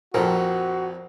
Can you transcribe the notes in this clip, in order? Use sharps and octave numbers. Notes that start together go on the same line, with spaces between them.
A#1 F2 C4 F#4 A4 A#4